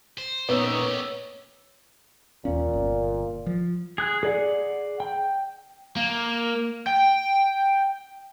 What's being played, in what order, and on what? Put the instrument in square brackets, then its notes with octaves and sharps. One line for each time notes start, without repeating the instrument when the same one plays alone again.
[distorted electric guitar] C5
[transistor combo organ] A#2 C#4 D#4 [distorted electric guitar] A3 G4 [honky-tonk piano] B3 [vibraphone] C#5 E6
[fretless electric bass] D#2 C#4 [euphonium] A#2
[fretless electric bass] G1
F3
[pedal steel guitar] G#4 F#6
G#4 D5 F#5
G5
[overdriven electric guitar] A#3
G5